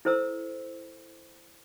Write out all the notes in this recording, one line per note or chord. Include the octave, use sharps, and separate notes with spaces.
E4 A4 C5 A#5 E6